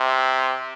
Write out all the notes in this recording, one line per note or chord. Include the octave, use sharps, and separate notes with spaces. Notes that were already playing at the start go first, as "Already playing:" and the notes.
Already playing: C3